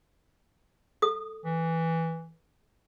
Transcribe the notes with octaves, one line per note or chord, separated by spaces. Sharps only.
A4 D#6
E3